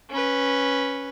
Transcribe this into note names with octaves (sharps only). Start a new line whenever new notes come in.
C#4 B4